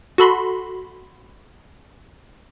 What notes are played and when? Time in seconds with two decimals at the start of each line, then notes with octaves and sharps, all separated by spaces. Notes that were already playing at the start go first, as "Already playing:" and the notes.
0.18 F#4 A4 B5 C6